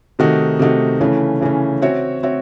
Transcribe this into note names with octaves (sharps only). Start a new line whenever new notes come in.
C3 D#3 A3 D#4 F#4
C3 D#3 A3 D#4 F#4
C#3 E3 A3 C#4
C#3 E3 A3 C#4
C4 F#4 C#5 E5
C4 F#4 C#5 E5